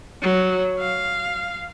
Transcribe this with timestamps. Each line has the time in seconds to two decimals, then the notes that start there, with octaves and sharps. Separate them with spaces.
0.22 F#3
0.79 F5